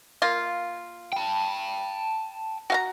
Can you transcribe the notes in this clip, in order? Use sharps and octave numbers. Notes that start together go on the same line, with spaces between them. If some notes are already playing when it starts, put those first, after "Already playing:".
A#3 F4
G5 A5
F#4 F5 A#5